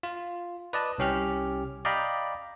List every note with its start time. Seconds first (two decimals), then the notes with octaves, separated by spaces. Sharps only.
0.03 F4
0.73 B4 D5 D#5 A5
0.98 C2 C#4 G4 F6
1.85 D5 D#5 F5 G5 A#5 B5